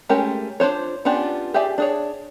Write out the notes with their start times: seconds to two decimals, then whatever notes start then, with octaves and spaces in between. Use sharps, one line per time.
0.09 G#3 A3 C#4 G4 A#4
0.60 D4 F4 C5 C#5
1.05 B3 C#4 D4 F4 G4
1.54 G4 G#4 D5 E5 G#5
1.78 D4 G#4 C#5